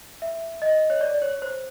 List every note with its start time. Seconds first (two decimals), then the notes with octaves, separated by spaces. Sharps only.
0.22 E5
0.62 D#5
0.90 C#5
1.01 D5
1.22 C#5
1.42 C5